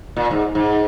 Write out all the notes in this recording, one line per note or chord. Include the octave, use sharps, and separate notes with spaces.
A#2
G#2
G#2